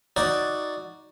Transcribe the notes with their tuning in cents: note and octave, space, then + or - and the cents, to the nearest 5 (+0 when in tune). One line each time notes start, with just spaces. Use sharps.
D#4 +10 F#4 +0 D5 +0